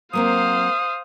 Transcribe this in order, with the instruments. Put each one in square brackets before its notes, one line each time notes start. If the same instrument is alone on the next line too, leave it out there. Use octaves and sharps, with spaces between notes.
[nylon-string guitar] F#3 A#3 C4 [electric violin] C5 F5 [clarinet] D#6